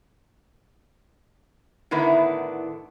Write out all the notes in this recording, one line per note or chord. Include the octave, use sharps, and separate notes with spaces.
A2 D3 D#3 B3 D4 E4